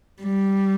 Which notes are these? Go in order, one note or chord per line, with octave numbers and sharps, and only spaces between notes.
G3